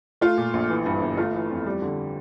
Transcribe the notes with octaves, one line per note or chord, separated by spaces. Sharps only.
A3 F4
A#2
A#1
E3
G2
G1
A3 F4
E3
F2
G3
D3